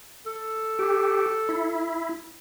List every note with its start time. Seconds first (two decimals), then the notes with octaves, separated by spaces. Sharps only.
0.26 A4
0.79 G4
1.49 E4